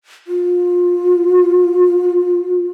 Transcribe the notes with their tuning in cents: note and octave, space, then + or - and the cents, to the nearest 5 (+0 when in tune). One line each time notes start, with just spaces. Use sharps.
F4 +25